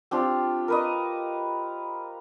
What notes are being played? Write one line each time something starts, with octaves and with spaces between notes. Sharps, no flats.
C4 D4 F4 G4
A#4 B4 D#5